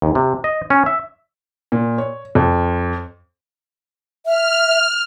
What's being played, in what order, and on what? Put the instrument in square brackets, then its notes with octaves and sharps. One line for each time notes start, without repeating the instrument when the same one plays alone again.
[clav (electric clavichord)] D#2
C3
D#5
C#4
E5
[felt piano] A#2
C#5
F2
[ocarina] E5 [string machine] F6